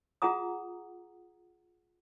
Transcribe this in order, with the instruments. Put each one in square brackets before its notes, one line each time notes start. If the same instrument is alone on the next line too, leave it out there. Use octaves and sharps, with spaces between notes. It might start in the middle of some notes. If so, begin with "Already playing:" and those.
[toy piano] F4 G#4 F#5 A#5 D#6